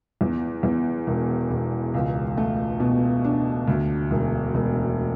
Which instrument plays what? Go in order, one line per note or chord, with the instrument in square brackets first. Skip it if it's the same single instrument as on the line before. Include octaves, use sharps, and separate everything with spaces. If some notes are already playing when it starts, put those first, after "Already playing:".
[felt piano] E2
E2
E1
E1
C#2
A3
B2
D4
D2
E1
E1